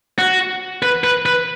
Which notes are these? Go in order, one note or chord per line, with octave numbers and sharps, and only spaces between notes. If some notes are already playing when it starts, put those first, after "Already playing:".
F#4
B4
B4
B4